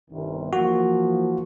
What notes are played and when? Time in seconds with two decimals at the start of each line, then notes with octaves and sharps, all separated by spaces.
0.11 G1 C2 D#3
0.53 E3 F3 A#3 F#4